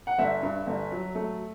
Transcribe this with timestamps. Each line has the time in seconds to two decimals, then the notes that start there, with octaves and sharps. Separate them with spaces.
0.07 F#5
0.18 G1 E5
0.42 G2
0.67 G1
0.91 F#3
1.15 A3